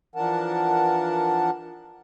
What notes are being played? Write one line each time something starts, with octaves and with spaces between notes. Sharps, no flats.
E3 F3 D4 A#4 F#5 A5